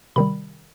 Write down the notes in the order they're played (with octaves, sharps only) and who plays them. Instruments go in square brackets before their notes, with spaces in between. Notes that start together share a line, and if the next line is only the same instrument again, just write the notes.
[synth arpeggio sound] C3 D#3 G3 B5